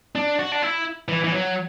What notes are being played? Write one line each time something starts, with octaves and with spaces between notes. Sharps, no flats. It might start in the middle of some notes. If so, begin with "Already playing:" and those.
D4
F#4
D4
E4
E3
E3
F#3